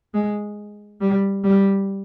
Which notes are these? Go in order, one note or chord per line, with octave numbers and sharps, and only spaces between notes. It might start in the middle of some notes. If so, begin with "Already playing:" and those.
G#3
G3
G3